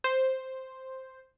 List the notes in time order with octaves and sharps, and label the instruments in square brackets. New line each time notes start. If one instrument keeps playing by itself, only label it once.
[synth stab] C5